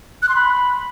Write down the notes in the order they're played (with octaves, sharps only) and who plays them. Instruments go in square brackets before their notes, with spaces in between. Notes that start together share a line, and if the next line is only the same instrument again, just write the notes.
[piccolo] F#6
C6
B5